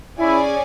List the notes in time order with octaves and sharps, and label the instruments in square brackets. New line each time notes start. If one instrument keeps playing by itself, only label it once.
[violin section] C#4 G#4 D5 G#5 [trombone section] E4